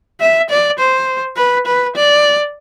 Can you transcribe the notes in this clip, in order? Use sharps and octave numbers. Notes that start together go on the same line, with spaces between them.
E5
D5
C5
B4
B4
D5